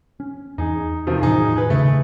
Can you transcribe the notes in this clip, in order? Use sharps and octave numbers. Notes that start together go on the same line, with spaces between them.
C#4
E2 D#4 G#4
C3 D#3 F3
E2 A2 D#3 D#4 G#4
G#4 B4
A#2 C#3 A3